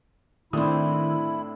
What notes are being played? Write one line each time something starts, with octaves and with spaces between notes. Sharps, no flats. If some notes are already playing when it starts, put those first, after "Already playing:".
A2 D#3 A3 C4 D4 E4 D#6